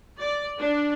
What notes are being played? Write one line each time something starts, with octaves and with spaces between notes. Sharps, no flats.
D5
D4